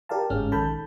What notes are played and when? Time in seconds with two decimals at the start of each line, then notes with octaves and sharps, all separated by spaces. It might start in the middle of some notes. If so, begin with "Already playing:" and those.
0.09 G4 A#4 D5 F5 A5
0.30 G1 G#2 G#3 C#4 F6
0.51 A#1 D#3 A4 A5 B5 G6